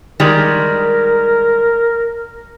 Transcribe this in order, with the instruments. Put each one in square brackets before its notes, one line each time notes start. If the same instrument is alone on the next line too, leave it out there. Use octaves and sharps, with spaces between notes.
[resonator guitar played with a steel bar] D#3 G3 G#3 [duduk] A#4